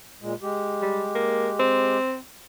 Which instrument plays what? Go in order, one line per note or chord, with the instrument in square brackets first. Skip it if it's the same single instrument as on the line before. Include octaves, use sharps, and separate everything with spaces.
[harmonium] A#2 G#3
G#3 G4
[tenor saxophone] G3
A#3
C4